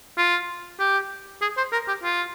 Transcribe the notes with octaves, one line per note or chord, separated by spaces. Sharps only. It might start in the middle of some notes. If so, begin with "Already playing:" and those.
F4
G4
G#4
C5
A#4
G4
F4